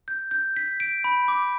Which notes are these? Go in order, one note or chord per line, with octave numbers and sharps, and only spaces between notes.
G6
G6
B6
D7
B5
D6